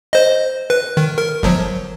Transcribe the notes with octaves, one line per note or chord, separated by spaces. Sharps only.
C5 D#5
B4
D#3
A#4
G1 F3 F#3